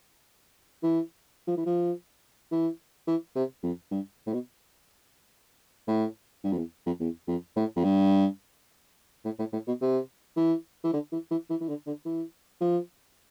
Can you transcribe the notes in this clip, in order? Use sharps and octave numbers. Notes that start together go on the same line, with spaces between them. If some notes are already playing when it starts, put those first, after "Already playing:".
E3
F3
E3
F3
E3
E3
C3
F2
G2
A2
B2
A2
G2
F2
E2
F2
E2
F2
A2
F2
G2
A2
A2
A2
B2
C3
E3
E3
D3
E3
E3
E3
E3
D3
D3
E3
F3